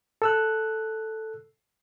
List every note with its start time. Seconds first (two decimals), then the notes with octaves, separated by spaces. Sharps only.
0.22 A4 E6 F#6